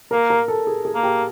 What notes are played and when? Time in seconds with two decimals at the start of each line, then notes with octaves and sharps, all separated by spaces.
0.11 A#3 A#4
0.30 A#4
0.48 A4
0.67 G#4
0.85 G#4
0.95 A#3
1.03 G4